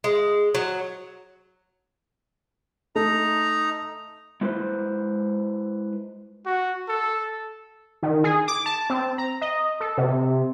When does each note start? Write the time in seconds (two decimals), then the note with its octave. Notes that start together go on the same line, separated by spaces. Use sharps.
0.04 G#3
0.55 F#3
2.96 A3 D#4 A#5
4.41 G#3 E4 B4 C5
6.46 F#4
6.89 A4
8.03 D#3
8.24 G#4
8.48 D6
8.66 A5
8.90 C4
9.18 A#5
9.42 D#5
9.80 A4
9.98 C3